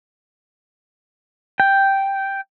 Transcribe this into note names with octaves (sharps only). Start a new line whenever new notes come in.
G5